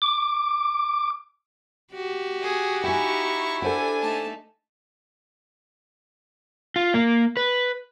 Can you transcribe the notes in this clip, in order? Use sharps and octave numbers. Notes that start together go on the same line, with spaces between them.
D6
F#4 G4
G#4
D#4 E4 G5 G#5 C#6
D4 A4 C5 F#5 G#5
A3 D#4 A5
F4
A#3
B4